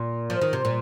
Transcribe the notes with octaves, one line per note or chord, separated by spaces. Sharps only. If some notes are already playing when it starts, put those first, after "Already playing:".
Already playing: A#2
F3
D#3
C3
A#2